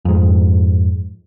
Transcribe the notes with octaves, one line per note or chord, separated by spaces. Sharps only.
F2 G#2